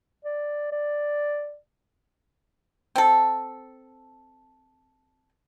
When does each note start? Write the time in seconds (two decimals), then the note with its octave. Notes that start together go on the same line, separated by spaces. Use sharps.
0.24 D5
0.72 D5
2.96 C4 A4